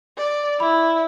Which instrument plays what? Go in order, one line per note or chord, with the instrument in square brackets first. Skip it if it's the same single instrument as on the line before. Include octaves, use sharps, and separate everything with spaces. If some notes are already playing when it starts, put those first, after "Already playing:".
[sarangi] D5
[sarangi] E4 [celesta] B5